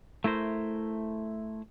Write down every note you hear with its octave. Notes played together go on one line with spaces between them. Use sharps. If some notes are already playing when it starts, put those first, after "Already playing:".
A3 E4 A#4 C5